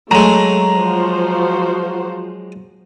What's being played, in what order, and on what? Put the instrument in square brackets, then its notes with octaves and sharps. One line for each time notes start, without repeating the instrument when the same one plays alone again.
[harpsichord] F#3 G#3 [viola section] A3 [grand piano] A#5
[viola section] F3 F#4 C5